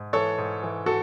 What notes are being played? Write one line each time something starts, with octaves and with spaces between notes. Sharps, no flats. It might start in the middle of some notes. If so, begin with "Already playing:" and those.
Already playing: G#2
E3 A4 C#5
G#2
E3
F#4 A4